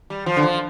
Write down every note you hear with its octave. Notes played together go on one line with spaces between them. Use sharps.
G3
F3
D3
F3